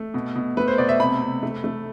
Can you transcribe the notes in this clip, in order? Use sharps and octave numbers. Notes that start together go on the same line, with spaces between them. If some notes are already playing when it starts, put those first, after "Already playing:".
Already playing: A3
B2
B2
A3 B4
C5
B2 D5
E5
C3 B5
C3
A3
A3